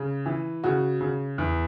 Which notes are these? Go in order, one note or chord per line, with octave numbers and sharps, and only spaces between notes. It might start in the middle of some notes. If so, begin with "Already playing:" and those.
Already playing: C#3
E3
C#3 F#4
C#3
E2